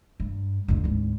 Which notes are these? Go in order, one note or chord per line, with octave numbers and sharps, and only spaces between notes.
G2
F2 D3
G#1 D2